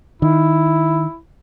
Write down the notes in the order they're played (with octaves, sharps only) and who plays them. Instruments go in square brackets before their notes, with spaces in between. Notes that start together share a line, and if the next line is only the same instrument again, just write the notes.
[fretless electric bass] D#3 [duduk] E4